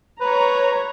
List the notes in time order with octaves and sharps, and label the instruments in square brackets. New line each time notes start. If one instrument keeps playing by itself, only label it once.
[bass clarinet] B4 [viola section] C#5 A#5